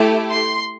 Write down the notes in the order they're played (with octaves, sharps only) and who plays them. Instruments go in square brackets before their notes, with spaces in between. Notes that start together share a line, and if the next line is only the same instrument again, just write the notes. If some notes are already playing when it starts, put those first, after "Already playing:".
Already playing: [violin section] A3 E4 G4
C6